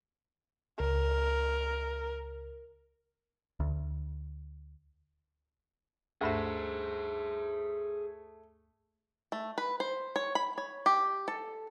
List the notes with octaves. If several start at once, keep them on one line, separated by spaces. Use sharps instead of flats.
C#2 A#4
D2
D2 G2 A3 G#4 C5 E5
A3
B4
C5
C#5
B5
C#5
G4
A4